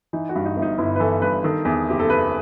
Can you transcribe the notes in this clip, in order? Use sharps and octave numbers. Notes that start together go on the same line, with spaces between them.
E3 D#4
F#4
G2
D#4
G1
D#4
G1 E4
B4
E3 A4
G2 B4
D#3 A4
E2
F#1 G4
A4
F#1 B4